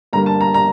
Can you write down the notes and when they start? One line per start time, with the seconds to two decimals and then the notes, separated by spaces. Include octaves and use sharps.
0.13 G2 D3 G3 A#3 A#5
0.26 A5
0.41 A#5
0.54 A#5